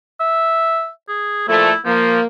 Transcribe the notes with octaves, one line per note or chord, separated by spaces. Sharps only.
E5
G#4
A#2 F3 A3 E4
F3 A#3